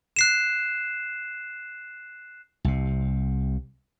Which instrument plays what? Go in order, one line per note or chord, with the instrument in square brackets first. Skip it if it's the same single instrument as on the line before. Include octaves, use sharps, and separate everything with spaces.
[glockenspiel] F#6 C7 E7
[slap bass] C2 C3